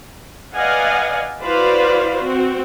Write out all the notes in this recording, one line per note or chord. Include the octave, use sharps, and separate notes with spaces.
B4 D5 D#5 F5 F#5 G#5
E4 F#4 B4 C5 D5 F5
C4 F#4